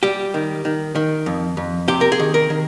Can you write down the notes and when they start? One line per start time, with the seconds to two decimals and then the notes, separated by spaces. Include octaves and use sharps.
0.03 G3 G4
0.34 D#3
0.65 D#3
0.95 D#3
1.26 F2
1.57 F2
1.88 C3 G4
2.01 A#4
2.12 G#4
2.19 D#3
2.34 A#4
2.50 D#3